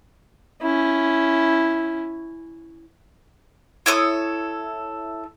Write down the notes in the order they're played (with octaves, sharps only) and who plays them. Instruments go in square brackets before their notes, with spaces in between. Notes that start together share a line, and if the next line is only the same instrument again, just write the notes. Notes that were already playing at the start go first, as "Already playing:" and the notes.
[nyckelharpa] C#4 E4
[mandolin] E4 A4 C#5 D#6